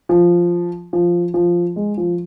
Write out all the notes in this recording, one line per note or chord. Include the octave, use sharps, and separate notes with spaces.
F3
F3
F3
G#3
F3